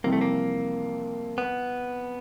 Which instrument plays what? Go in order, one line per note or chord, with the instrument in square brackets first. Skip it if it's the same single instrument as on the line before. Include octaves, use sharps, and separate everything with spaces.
[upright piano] F2 C3 E3 G3 C4 [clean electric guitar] A#3
[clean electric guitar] A3
A#3
B3